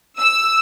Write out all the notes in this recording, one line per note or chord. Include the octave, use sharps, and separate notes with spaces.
E6